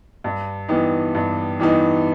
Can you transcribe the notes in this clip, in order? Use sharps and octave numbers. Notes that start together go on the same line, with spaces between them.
G2
E3 G3 B3 D#4
G2
E3 G3 B3 D#4